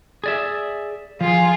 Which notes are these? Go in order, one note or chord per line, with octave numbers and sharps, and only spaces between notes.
G#4 D5 E5
F3 F4 G#4